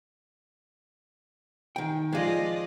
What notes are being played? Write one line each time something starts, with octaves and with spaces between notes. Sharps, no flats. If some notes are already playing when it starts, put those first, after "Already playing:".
D#3 G5
F3 G#3 F4 D5 D#5